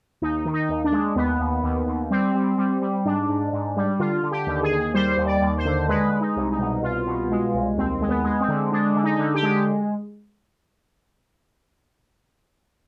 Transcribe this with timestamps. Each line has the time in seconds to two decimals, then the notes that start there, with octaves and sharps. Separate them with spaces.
0.22 D#2 D#4
0.45 D#3
0.54 D#4
0.69 D#2
0.84 D4
0.92 G#3
1.16 D#2 B3
1.40 D#2
1.64 D#2
1.87 D#2
2.11 G3 C4
2.35 G3
2.58 G3
2.82 G3
3.05 G#2 D4
3.29 G#2
3.53 G#2
3.77 G3
3.99 D3 F4
4.23 D3
4.32 G4
4.47 D#2
4.63 G#4
4.71 D#2
4.94 G3 C5
5.18 D#2
5.26 D5
5.41 D#2
5.58 C5
5.65 D3
5.88 G#3 B4
6.13 G#3
6.21 D#4
6.36 C2
6.52 D#4
6.59 B2
6.83 C2 F4
7.06 B2
7.30 G#3
7.54 C2
7.77 D#2 C4
8.01 G#3
8.09 B3
8.24 G#3
8.41 C4
8.48 D3
8.72 G#3 D4
8.96 D3
9.04 D#4
9.19 D3
9.35 G4
9.43 G#3